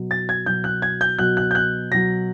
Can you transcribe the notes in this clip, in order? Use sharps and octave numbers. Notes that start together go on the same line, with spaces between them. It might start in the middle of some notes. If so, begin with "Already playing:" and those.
Already playing: B2 F#3
A6
G#6
B2 F#3 G6
F#6
G#6
G6
B2 F#3 F#6
F#6
G6
F#6
B2 F#3 A#6